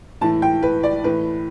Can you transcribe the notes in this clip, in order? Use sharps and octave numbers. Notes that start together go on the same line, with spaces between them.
A2 E3 A5
G5
B4
D5
A2 E3 B4